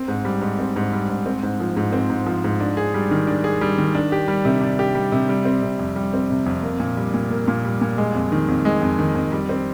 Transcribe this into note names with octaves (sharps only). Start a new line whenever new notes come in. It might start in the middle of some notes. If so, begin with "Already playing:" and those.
Already playing: C4
G#2
G3
G#2
C4
G#2
G3
G#2
C4
G#2
F3
G#2
C4
G#2
F3
G#2
D4
G#4
G3
D#3
D4
G#4
G3
D#3
D4
G4
G3
C3
D4
G4
G3
C3
G3
C4
C3
F2
G3
C4
C3
F2
A#3
A#2
G3
A#2
A#3
A#2
G3
A#2
G#3
F2
D#3
F2
G#3
F2
D#3
F2
G3
C4